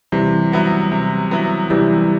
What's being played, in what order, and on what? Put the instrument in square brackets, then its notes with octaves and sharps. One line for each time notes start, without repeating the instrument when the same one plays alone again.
[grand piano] C3 [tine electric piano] E3 G3
[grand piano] F#3 B3 E4
C3
F#3 B3 E4
[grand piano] C3 [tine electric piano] E3 G3